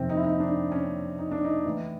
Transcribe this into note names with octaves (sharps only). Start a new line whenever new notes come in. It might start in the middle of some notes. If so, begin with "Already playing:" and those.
Already playing: F2 C3 D#3 C4
D#4
E4
D#4
D4
C#4
D#4
D4
D#4
A2 E3